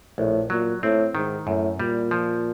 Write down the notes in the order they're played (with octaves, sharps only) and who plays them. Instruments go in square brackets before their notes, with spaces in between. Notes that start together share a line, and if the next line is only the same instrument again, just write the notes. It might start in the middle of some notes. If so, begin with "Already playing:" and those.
[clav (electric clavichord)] A#1 [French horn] A2
[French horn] A#2 [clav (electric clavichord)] F#3
[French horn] A2 [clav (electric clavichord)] C4
[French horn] G#2 [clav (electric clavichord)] D#3
[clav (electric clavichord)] F#2 [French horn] A2
[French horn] A#2 [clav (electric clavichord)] G3
[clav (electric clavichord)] F3